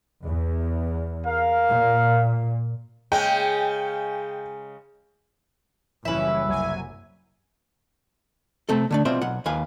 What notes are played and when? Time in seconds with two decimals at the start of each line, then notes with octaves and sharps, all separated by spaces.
0.24 E2
1.27 A#4 F5
1.68 A#2
3.12 C#3 G#3 G5
6.05 F#1 E3 G3 C#4 E4 B4 E5
6.46 C2 F#3 G#5
8.69 C3 A3 C4 A4
8.91 D3 A3 D4
9.05 B2 C4 F4 C5 D5 E5
9.21 B1 F#5
9.46 D#2 B4 F5 G#5